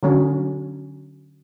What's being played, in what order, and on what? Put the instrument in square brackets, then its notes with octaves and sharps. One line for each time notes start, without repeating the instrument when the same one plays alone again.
[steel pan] D3 F#3 C#4